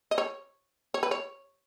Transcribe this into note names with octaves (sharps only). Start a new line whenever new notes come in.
D#5
C#5
C#5
B4
C#5